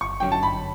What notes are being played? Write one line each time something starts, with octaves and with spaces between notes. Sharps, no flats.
G1 C#6
F#2 D3 F#3 C#4 G5
A5
G1 B5